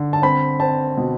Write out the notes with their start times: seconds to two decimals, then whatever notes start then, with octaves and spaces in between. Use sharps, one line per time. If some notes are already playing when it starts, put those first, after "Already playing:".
Already playing: D3
0.13 A5
0.22 C4 B5
0.60 C4 A5
0.97 B2